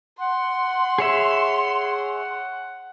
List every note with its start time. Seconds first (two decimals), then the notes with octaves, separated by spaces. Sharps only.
0.20 F#5 C6
0.98 G#4 C#5 E5